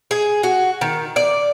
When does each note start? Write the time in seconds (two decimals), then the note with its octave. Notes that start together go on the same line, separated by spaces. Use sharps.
0.11 G#4
0.43 F#4
0.81 D#3
1.16 D5